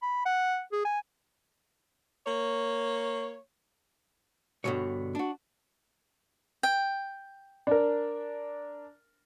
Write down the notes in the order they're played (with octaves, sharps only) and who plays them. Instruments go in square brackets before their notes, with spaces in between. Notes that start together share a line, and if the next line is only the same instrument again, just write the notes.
[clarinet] B5
F#5
G#4
G#5
[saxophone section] A#3 C#5
[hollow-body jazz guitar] G2 B2 D3 E3 F#3 C#5
D4 F#4
[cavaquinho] G5
[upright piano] D4 A#4